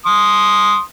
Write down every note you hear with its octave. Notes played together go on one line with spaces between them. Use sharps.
C6 D#6